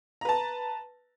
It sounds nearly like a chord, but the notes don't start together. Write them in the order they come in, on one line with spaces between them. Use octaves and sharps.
A#5 B4 A5